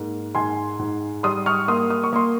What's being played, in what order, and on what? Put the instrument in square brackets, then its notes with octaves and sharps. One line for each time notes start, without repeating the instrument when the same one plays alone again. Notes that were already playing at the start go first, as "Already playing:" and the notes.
Already playing: [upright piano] G#2 A#3
G#2 G#5 C6
G#2
G3 C6 D#6
C#6 F6
A#3 C6 D#6
D#6
C#6
A#3 C6